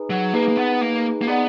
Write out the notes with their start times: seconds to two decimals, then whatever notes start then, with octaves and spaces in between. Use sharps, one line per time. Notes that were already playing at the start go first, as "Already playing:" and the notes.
Already playing: D#4 G#4 B4
0.10 F#3
0.34 A#3 D#4 G#4 B4
0.48 A#3
0.57 B3
0.81 A#3
1.21 A#3
1.27 B3 D#4 G#4 D5 F#5